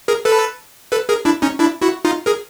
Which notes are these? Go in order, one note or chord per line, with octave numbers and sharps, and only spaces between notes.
G#4 A#4
A4 B4
A4 B4
G#4 A#4
D4 E4
C#4 D#4
D4 E4
E4 F#4
D#4 F4
G#4 A#4